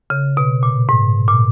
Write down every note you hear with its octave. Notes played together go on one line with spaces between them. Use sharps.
C#3
B2
A#2
G#2
A#2